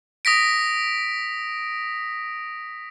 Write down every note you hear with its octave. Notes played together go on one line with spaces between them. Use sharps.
D#6 A#6 B6 D7